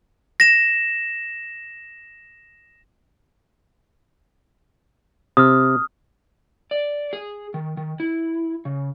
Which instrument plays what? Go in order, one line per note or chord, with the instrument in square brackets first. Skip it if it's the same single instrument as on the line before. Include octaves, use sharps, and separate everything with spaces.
[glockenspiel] A#6 E7
[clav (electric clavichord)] C3 [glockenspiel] D#6 F6
[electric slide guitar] D5
G#4
D#3
D#3
E4
C#3